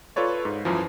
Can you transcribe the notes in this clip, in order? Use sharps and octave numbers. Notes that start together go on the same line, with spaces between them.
F4 A4 B4 C#5 D5
G#2
F#2 E3 F3